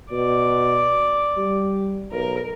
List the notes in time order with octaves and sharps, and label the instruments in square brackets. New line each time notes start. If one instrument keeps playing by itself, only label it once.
[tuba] B2 [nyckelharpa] D5
[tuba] G3
[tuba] B1 [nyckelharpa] A#4